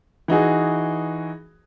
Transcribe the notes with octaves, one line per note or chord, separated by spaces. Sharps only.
E3 D#4 F#4 G#4